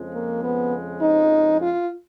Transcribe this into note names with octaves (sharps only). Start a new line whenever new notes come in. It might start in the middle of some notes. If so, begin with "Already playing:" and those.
Already playing: F2 C#3 F3 G#3
A#3
B3
D#4
F4